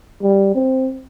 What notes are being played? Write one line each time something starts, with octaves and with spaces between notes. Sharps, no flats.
G3
C4